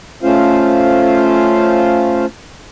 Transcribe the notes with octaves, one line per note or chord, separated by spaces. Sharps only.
A3 C#4 F4 C5 F5